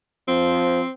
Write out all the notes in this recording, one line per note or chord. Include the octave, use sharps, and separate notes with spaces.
F3 C4